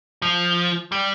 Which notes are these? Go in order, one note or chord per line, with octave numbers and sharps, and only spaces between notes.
F3
G3